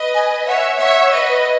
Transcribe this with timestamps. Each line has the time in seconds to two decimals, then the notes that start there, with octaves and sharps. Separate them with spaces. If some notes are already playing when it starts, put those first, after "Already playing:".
Already playing: B4 D#5
0.14 G#5
0.47 C#5 E5 F#5
0.80 C#5 E5 F#5
1.12 B4 D#5